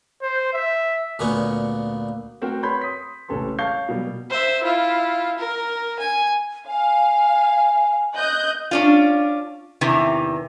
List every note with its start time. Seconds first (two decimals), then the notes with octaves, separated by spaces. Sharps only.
0.22 C5
0.53 E5
1.19 D2 A#2 A#3 B3 C#5 G#5
2.41 A3 C4 F#4 A#4 G5
2.63 B4 C#5 B5 C6 G6
2.81 C6 D#6 B6
3.28 A1 C3 C#4 A4 B4 C6
3.59 C#5 F5 A5 C#6 G6 C7
3.89 B2 F#3 G3 A#3 G4
4.30 C5 E5
4.63 E4 F4
5.39 A#4
6.00 G#5
6.68 F5 G#5
8.16 D#5 F#6 G6
8.71 C#4 D4 F4
9.81 E2 C3 D#3 E3